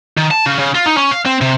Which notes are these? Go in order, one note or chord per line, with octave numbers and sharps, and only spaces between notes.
D#3
A5
C#3
C#3
F4
D#4
C#4
F5
C4
C3